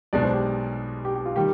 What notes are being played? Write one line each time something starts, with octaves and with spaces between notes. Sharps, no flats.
B1 B2 G#3 D4 D5
C5
G4
G4
G4
F4
D#3 G3 G4